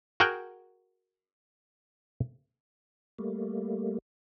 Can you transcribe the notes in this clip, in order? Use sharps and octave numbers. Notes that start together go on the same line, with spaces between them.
F#4 G#4 A#4 F#5 G5
G3 A3 A#3